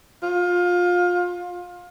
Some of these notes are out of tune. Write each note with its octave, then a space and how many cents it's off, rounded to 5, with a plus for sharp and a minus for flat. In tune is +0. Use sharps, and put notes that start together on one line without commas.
F4 +25